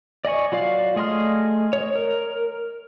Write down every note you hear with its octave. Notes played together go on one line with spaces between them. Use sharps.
D5 D#5 G#5 C#6
F#3 F4 D5 F5
A3 G#4 D#5 C6 F6
C#5
A#4